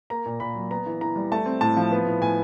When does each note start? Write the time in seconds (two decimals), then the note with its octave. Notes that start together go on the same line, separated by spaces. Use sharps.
0.10 A#3 A#5
0.26 A#2
0.40 A#2 B5
0.55 F#3
0.71 B3 A#5
0.86 E3
1.01 E3 A#5
1.16 G3
1.32 A3 A5
1.46 C4
1.61 A2 A5
1.77 F3
1.92 B3
2.06 A2
2.21 A2 G#5